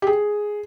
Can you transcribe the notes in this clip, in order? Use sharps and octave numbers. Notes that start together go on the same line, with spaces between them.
G4
G#4